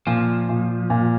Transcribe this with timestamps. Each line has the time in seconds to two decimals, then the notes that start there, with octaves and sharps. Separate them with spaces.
0.07 A#2 F3
0.49 A#2
0.90 A#2